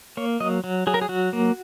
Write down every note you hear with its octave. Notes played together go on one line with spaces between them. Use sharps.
A#3 C#5
F#3 D#5
F#3
F#3 G#4
A#4
G#4
F#3 F#4
A#3